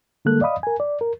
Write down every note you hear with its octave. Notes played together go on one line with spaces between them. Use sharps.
D3 G3 G#3 A#3 A4 F#6
D5 D#5 F5 B5 D#6
A#4 G#5
D5
A#4